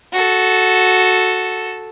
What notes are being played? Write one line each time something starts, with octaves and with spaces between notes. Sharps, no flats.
F#4 A4